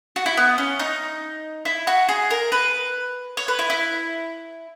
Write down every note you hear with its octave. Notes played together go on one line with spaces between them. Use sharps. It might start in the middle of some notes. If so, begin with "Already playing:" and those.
F#4
E4
B3
C#4
D#4
E4
F#4
G#4
A#4
B4
C#5
B4
E4
E4